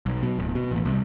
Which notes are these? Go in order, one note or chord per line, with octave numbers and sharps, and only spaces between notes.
B1
B2
D1
B2
A1
C2